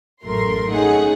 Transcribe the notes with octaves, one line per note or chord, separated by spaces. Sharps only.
A1 F#2 A3 A#4 C6
A3 C#4 D#4 G#4 F#5